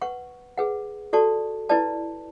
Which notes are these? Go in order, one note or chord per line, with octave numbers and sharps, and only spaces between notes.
B4 F#5 C#6
G#4 B4 F#5
F#4 A4 D5 A5 C#6
E4 B4 D5 A5